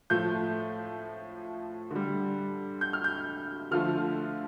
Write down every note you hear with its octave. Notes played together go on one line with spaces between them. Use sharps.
A2 F3 A3 G6
D3 G3
G6
F6
G6
D3 F3 A3 F6